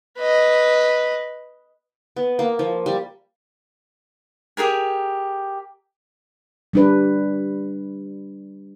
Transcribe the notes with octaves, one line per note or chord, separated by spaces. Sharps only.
B4 D#5
B3
A#3
F3
G3
G4 G#4 A#4 G#5
G3 D4 B4